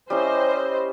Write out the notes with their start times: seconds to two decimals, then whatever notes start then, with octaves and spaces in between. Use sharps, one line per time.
0.10 G3 C#4 E4 C5 D#5